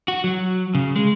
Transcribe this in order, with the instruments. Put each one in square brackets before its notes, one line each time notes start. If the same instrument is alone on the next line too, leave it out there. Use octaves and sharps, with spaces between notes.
[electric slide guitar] F#4
F#3
C#3
G#3